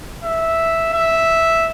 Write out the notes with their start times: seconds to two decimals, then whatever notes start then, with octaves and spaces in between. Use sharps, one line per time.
0.24 E5
0.93 E5